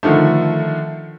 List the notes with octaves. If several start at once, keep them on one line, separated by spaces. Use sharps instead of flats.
D3 D#3 F3 A3